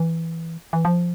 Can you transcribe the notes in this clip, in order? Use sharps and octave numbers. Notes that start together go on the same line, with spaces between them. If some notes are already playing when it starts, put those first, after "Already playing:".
Already playing: E3
E3
F3